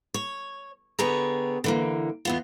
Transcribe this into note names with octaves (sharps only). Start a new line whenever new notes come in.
C#5
D3 B3 G4 G#4 C#5 A#5
D3 E3 A#3
E2 B3 F4